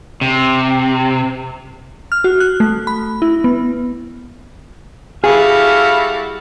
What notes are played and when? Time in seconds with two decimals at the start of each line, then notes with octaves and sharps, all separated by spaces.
0.21 C3
2.12 F6
2.24 F#4
2.40 F#6
2.60 A3
2.87 B5
3.22 E4
3.44 B3
5.24 G3 E4 F#4 G#4 A4 F5